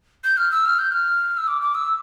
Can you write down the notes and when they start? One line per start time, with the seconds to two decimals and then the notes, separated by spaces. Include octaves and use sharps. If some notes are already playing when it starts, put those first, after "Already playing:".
0.24 G6
0.37 F6
0.52 E6
0.65 F6
0.79 G6
0.92 F6
1.37 E6
1.48 D6
1.62 D6
1.75 E6